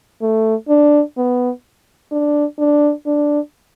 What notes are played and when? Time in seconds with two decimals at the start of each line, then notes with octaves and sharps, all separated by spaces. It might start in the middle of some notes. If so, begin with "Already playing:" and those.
0.22 A3
0.69 D4
1.17 B3
2.12 D4
2.59 D4
3.06 D4